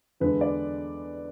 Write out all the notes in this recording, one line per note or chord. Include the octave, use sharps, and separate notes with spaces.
E2 D3 G#3 B4
D5